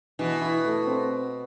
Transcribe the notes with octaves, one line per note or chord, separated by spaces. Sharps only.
B2 E3
E4
A3
C4